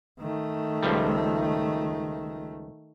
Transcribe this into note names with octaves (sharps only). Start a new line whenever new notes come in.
D#3 A3
C#2 F3 G3